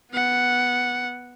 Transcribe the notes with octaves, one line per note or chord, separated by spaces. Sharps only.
B3 F#5